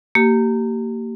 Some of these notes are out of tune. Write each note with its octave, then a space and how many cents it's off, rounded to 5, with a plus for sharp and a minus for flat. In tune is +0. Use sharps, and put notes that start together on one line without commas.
A#3 -25 G4 -20